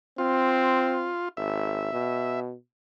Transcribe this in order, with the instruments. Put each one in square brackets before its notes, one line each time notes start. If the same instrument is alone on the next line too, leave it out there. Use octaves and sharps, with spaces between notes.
[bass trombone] C4 [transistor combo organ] F4
[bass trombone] G#1 [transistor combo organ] E5
[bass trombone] B2